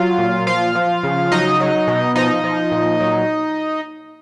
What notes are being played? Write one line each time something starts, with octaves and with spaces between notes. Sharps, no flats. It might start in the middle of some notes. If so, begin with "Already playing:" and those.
Already playing: F#3 F4 F5
A#2
F3 F4 F5
F3
C#3
F#3 D#4 D#5
F#3
B2
F3 D#4 D#5
F3
A#2
F#3